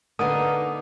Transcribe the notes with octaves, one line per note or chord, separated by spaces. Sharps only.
D3 A#3 B3 D#4 D#6